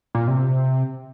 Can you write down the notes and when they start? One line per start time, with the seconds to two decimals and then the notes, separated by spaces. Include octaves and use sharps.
0.15 A#2
0.27 C3